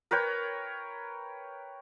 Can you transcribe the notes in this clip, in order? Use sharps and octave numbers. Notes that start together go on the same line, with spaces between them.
A#4 B4 C#5 G5